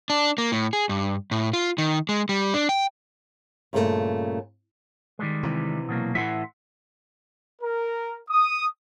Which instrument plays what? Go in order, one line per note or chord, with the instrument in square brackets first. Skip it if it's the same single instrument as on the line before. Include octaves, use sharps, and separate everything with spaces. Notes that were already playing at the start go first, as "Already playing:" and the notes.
[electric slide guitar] D4
A#3
A2
G#4
G2
A2
F4
D#3
G#3
G3
D4
G5
[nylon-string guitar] G2 A#2 C#3 F#3 A3 A#3
[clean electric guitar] D#3 G3 G#3
[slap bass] C3 E3
[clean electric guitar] B2 F#3 A#3
[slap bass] A2 E3 [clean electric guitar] E5 F#5 C6
[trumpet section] A#4
D#6